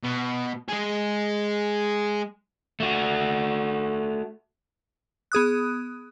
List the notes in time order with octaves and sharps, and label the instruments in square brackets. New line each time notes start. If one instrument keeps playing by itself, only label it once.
[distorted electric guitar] B2
G#3 G#4
[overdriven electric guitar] A3 F#4
[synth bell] B3 G#4 D#6 F#6